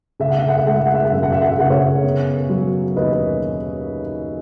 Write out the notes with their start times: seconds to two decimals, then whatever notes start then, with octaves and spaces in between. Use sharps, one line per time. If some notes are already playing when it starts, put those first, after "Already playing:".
0.20 C#3 E5
0.30 F#5
0.38 E5
0.48 F#5
0.58 E5
0.66 G#3 F#5
0.76 E5
0.86 F#5
0.95 E5
1.04 F#5
1.11 F#2 E5
1.23 F#5
1.32 E5
1.42 F#5
1.52 E5
1.59 C#3 F#5
1.70 C#5 E5
2.04 B3
2.49 F#3
2.96 D#2 B4 D#5